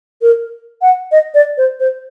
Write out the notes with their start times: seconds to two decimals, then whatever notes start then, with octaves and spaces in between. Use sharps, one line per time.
0.22 A#4
0.82 F#5
1.12 D#5
1.34 D5
1.58 C5
1.80 C5